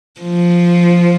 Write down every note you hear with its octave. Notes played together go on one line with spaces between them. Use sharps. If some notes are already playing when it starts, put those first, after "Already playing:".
F3